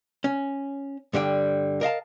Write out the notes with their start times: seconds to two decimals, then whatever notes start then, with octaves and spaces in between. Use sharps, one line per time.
0.24 C#4
1.13 G2 D3 G3 G5
1.81 A#4 D#5 F5 A5